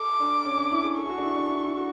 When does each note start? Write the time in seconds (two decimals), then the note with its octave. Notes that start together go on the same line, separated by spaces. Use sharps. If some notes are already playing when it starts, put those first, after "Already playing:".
Already playing: A4 D6
0.20 D4
0.45 C#4
0.58 D4
0.71 E4
0.83 G#4
0.97 A4 C#6
1.05 G#4
1.09 F#4
1.18 D4
1.22 E4
1.36 D4
1.48 E4
1.65 E4
1.77 F#4